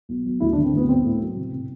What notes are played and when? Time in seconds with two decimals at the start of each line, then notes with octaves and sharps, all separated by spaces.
0.09 B1
0.26 F#3
0.40 D2 E4
0.53 D4
0.58 D3
0.64 C4
0.73 D2 B3
0.89 B1 C4
1.04 A2
1.20 F#3
1.37 C3
1.53 C3